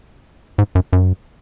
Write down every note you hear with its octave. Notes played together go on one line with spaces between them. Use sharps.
G#2
F#2
F#2